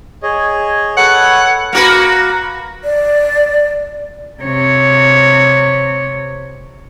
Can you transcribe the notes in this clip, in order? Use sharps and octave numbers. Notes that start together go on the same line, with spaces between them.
G#4 C#5 D#5
A4 B4 C#5 F#5
A#3 F#4 B4
D5
C3 C#5